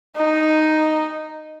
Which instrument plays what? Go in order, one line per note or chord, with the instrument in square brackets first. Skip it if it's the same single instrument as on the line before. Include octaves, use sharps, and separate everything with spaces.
[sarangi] D#4